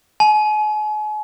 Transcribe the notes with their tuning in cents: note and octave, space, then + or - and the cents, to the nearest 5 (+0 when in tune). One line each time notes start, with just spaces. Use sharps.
G#5 +40